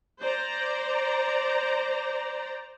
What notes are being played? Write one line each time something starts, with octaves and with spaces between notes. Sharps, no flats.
C5 D5 A#5